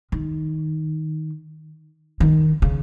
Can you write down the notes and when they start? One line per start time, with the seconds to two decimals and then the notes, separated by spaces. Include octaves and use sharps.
0.12 D#3
2.20 D#3
2.62 C#3